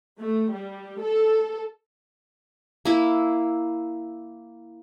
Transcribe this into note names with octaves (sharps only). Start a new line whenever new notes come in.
A3
G3
A4
A#3 E4